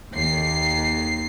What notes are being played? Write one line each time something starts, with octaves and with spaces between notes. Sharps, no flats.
D#2 C7